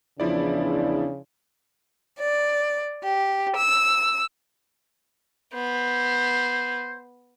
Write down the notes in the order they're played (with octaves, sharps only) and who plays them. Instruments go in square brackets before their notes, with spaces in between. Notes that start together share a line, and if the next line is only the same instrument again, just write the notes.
[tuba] E2 [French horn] C#3 [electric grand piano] F3 E4 D5 [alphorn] D4
[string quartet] D5
G4
E6
[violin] B3 [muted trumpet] C5